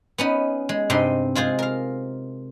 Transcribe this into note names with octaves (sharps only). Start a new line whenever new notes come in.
B3 C#4 D#4
G#3
G2 C3 D#4 D#5 C6
G#3 F4 G#4 C5
A#4 F5